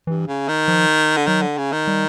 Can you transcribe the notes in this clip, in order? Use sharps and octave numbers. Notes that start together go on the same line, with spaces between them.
G2 E3
C#3
D#3
F3
D3
D#3 F#3
D3
C#3
D#3
G3